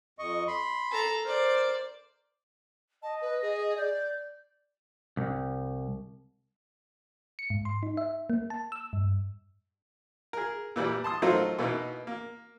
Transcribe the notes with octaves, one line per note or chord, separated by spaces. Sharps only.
F2 D#5 C#6
B5 C6
A4 A#5
A#4 C5 D5
D#5 A5
B4
G#4
D5 G6
C2
C#7
G#2
C6
D#4
E5
A#3
A5
E6
G2
G#4 A#4
A#2 E3 G3
A5 C6 D#6
F#3 A3 D#4 F4 A#4 C5
B2 E3 A#3 B3 D#4
A#3